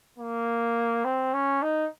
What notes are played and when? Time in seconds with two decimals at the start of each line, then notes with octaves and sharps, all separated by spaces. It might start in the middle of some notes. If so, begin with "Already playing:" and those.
0.18 A#3
1.05 C4
1.34 C#4
1.62 D#4